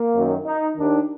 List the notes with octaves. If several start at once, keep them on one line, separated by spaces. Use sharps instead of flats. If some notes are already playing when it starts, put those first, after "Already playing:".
Already playing: A#3
F#2 D#3
D#4
D#2 D#3 D4